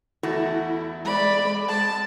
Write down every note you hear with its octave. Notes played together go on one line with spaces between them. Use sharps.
E2 A3 E4 F#4
G#3 D5 B5
A5